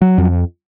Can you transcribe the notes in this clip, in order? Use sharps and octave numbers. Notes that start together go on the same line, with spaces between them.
F#3
F2